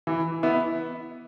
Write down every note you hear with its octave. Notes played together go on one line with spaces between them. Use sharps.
E3
B3 E4